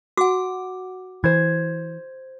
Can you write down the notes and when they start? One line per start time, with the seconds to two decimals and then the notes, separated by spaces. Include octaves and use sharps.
0.17 F#4 F#5 D6
1.24 E3 C5 G#6